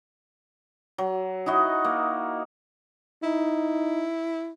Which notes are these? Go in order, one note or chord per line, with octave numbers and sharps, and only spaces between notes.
F#3
D#4 E4 F#4 D#5
A#3
D#4 E4